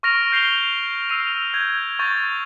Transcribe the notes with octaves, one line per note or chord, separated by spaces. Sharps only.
C#6 F6 A#6 D7 F7
G6 C7 F7 G7
E6 C7 D#7 F7
G6 G#6
C#6 G6 A6 F7